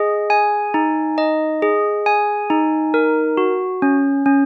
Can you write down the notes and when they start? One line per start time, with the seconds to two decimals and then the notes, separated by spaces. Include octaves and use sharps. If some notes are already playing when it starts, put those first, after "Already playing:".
Already playing: G#4 D#5
0.30 G#5
0.74 D#4
1.18 D#5
1.62 G#4
2.06 G#5
2.50 D#4
2.94 A#4
3.37 F#4
3.82 C#4
4.26 C#4